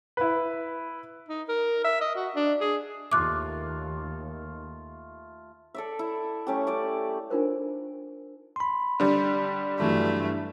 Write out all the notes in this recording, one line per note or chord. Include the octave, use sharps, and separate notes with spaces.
E4 B4
D#4
A#4
E5
D#5
F#4
D4
G#4
D#2 A3 F4 D6 F#6
A4 D5 E5
E4
A3 C#4 G4
D5 A5 D6
D4 D#4 F4 A#4 C5
B5 C6
D3 G3
G2 E3 F#3 A3